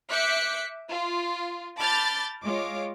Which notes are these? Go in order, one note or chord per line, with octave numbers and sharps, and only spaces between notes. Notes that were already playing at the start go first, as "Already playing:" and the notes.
E5 D6 F#6 G6 B6 C#7
F4
A5 B5 D6 F6 G6 A6
G#3 F4 C#5 D6